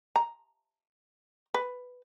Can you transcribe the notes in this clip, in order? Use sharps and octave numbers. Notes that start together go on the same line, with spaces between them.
A#5
B4